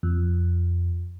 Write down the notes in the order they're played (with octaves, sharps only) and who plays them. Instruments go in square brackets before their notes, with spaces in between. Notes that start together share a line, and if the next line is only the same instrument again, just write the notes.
[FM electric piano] F2